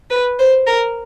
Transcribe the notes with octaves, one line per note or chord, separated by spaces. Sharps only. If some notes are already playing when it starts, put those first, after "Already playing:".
B4
C5
A#4